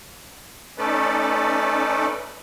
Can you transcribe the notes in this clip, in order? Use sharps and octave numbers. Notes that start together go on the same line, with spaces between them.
A3 C#4 D#4 A4 B4 D5